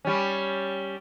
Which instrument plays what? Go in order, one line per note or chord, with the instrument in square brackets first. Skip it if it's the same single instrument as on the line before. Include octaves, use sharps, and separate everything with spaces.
[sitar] G3 C#4